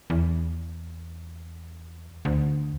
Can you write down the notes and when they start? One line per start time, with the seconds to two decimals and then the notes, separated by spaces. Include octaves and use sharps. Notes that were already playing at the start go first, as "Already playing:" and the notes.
0.10 E2
2.25 D2